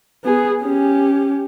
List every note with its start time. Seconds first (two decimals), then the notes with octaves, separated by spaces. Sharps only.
0.25 B3 G#4
0.63 C#4 G4